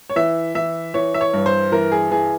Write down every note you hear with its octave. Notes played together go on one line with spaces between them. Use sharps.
C#5
E3 E5
E3 E5
E3 C#5
E5
C#5
G2
C5
E3 A#4
G#4
E3 G#4